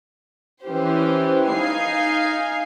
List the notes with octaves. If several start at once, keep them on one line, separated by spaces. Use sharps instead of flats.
E3 C#4 G4 C5
D#4 F5 G#5 C7